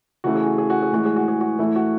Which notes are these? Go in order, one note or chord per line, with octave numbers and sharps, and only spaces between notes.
C#3 E3 A3 F#4
G#4
F#4
G#4
F#4
G#4
A2 E3 G#3 F#4
G#4
F#4
G#4
F#4
A2 E3 A3 E4
F#4